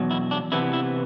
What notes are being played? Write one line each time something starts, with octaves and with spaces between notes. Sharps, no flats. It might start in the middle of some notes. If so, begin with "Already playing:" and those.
Already playing: E2 B2 F#3
E4
D4
C3 E3 B3 E4
E4